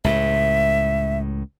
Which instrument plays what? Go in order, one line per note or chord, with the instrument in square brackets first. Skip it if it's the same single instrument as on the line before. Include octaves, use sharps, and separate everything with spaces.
[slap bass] C#2 A2 [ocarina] E5